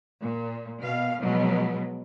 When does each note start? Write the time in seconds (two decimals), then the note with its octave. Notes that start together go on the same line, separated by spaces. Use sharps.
0.22 A#2
0.80 B2 F5
1.21 B2 F3 F#3 G#3